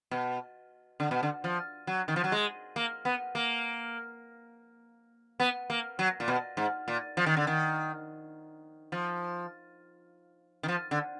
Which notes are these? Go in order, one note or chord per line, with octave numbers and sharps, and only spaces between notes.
B2
D3
B2
D3
F3
F#3
D#3
F3
F#3
G#3
A#3
B3
A#3
B3
A#3
F#3
A#2
B2
G#2
A#2
F3
D#3
D3
D#3
F3
D#3
F3
D3